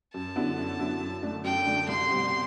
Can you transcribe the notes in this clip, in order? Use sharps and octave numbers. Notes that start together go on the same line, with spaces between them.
F#2 A5
D3 F#3 B3 E4
F#2
D3 F#3 B3 E4
F#2
D3 A3 D4
F#2 G5
D3 A3 D4
C2 C6
B2 G3 C4 G4